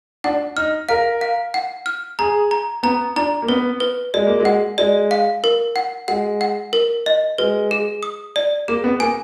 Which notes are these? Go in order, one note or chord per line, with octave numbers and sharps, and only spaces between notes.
D4 F#5
D#4 F6
A#4 F5
F5
F#5
F6
G#4 A#5
A#5
B3 A#5
D4 A#5
A#3
B3 B4
B4
G#3 D5
A#3
G#3
F#5
G#3 D5
F5
A#4
F#5
G#3 F#5
F#5
A#4
D#5
G#3 B4
G#4
D#6
D5
A#3 G#4
B3
A#3 G#5